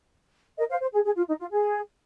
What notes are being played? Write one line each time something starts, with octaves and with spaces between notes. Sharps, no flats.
A#4 D#5
C5 F5
C5
G#4
G#4
F4
D#4
F4
G#4